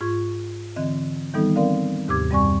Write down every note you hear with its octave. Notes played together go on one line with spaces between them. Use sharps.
G#2 F4 C#6 G#6
D3 E3 C4 D#5
D#3 E3 G3 B3 D#4 A4
C4 A#4 D5 F5
D#2 G#2 C3 G4 D6 G#6
F#2 G3 C4 D5 G#5 C#6